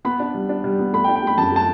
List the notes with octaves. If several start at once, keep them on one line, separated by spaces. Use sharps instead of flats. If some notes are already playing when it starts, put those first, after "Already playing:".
B3 B5
D4
G3
D4
G3
B3
A3 B5
G5
D4
G5
A3 B5
F#2 A5
A3 A5